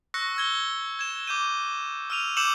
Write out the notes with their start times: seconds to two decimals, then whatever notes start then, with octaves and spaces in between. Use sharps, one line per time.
0.14 C#6 E6 F#6 A#6 C#7
0.37 E6 G#6 G7
0.99 G#6 E7
1.27 D6 G6 D#7
2.10 E6 F6 D#7 F7
2.37 D6 E6 G6 C#7 E7 F#7